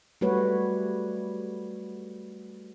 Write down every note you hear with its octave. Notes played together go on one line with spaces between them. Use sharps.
G3 A3 F#4 B4 C#5